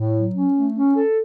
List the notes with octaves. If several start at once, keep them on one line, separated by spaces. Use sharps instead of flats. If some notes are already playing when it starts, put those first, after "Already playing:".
Already playing: A2
F#3
C#4
A3
C#4
A4